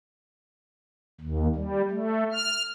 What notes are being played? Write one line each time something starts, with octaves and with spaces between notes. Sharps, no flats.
D#2
G3
A3
F6